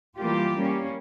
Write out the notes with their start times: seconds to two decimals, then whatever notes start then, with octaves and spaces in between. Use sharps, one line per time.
0.18 E3 G3 A#3 F4 G4
0.54 G3 A#3 C#4